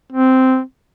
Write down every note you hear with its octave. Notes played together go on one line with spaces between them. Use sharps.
C4